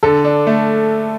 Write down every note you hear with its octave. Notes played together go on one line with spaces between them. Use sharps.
D3 A4
D4
A3